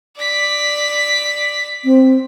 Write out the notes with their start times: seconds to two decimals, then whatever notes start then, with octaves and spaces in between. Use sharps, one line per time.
0.17 D5 B6
1.85 C4